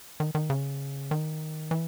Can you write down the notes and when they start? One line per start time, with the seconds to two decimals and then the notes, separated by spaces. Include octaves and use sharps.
0.20 D#3
0.35 D#3
0.50 C#3
1.11 D#3
1.71 E3